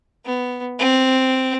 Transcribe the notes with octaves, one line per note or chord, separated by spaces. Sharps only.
B3
C4